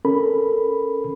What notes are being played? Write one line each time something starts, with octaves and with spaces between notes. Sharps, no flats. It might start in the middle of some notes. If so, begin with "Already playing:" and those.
C#4 A4 A#4 B5